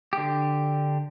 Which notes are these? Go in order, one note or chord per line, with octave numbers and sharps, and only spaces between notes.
D3 G4